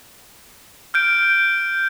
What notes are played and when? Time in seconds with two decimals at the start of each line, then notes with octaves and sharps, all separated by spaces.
0.94 F6 G6 D7